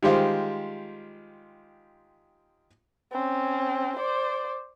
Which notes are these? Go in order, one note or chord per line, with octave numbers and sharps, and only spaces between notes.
D#3 G3 G#3 F4 G4 C5
C4 C#4
C5 D5